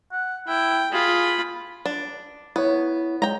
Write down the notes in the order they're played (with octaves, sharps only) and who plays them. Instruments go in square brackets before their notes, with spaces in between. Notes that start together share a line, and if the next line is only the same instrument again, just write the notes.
[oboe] F#5
[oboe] E4 [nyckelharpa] G5
[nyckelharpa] F4 B5 [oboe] G#4
[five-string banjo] D4
[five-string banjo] B3 [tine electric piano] E4 C#5
[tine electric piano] G#3 [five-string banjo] G5 A#5